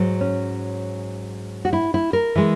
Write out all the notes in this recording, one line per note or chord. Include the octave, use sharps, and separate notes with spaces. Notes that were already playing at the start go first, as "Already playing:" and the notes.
Already playing: G#2 F#3
C#4
F#4
E4
E4
A#4
E3 G#3